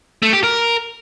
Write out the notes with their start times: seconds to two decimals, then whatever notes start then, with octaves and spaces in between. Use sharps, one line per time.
0.22 A3
0.33 G4
0.44 A#4